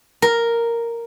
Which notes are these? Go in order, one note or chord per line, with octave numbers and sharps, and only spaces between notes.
A#4